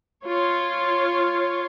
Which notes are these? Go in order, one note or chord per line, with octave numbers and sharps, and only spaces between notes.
F4 C#5